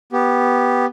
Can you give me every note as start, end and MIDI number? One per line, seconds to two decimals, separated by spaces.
0.13 0.86 59
0.13 0.86 67